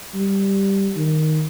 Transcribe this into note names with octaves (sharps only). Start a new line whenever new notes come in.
G3
D#3